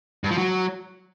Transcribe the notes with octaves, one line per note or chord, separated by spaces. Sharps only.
G2
F3
F#3